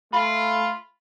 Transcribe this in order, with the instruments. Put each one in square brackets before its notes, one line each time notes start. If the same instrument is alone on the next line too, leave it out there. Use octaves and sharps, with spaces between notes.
[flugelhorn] A3 [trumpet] F4 [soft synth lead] B5